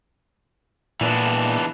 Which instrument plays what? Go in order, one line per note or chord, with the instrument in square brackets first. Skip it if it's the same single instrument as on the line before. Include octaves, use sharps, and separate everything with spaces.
[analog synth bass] A#2 [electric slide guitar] E3 B3 D4